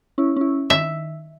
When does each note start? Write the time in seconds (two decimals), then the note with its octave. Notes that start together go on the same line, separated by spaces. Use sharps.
0.18 C#4 E4
0.36 C#4 E4
0.70 D#3 E5